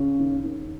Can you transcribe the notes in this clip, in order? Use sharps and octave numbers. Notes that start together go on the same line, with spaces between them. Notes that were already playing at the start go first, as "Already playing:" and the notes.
Already playing: C#3
D#2
D#2